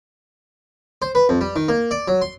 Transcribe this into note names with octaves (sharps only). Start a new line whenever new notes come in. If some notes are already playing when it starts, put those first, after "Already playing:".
C5
B4
F2
G3
D#3
A#3
D5
F#3
C6